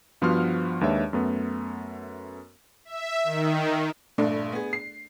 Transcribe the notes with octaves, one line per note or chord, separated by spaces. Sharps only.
G2 F3 B3 F#4 C6 F6
D#2 G#3 D4 B4 C#5 E5
F#2 A3 B3
E5
D#3
A#1 G2 A3 D4
B3 G#4
C7